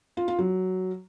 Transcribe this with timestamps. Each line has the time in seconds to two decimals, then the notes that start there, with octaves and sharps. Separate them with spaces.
0.17 F4
0.28 F4
0.39 F#3